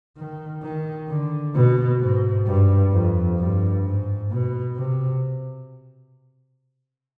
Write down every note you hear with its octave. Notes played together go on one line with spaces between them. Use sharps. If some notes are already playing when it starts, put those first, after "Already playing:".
D#3
D#3
D3
B2
G#2
G2
F2
G2
G#2
B2
C3